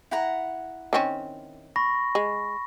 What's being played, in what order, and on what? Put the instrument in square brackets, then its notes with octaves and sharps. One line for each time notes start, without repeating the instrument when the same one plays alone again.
[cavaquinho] E4 F#5 A#5
[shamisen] D#3 C4 C#4
[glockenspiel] B5 C#6 A#6
[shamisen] G#3